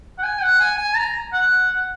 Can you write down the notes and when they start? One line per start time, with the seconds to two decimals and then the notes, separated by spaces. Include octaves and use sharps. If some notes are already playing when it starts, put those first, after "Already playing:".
0.18 F#5
0.23 G#5
0.41 F#5
0.60 G#5
0.78 G#5
0.96 A#5
1.33 F#5